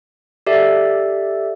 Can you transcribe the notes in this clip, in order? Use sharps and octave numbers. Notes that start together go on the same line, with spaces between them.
G4 A4 D5 E5